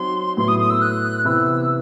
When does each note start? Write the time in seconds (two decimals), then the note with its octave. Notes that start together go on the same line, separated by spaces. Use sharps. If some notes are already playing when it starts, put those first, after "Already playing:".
Already playing: F#3 C4 D#4 C6
0.37 A2 F#3 B3 E4 C6
0.48 D#6
0.59 D#6
0.70 E6
0.82 F#6
1.25 C3 E3 B3 E4 E6